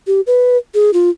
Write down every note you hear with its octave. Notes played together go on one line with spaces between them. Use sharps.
G4
B4
G#4
F4